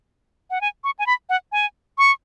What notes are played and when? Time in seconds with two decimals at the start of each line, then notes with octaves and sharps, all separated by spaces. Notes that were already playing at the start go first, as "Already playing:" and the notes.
0.50 F#5
0.61 G#5
0.84 C#6
0.99 G#5
1.07 B5
1.29 F#5
1.52 G#5
1.98 C#6